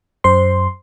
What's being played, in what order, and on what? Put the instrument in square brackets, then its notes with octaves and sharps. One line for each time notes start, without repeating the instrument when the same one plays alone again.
[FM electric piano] F#2 C5 C6